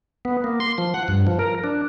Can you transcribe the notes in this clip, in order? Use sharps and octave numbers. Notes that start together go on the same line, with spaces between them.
B3
A#3
C6
F3
F#5
G2
F3
A#4
D4